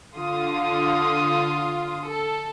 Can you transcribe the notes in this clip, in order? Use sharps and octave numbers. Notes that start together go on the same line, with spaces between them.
D3 F4 D#6
A4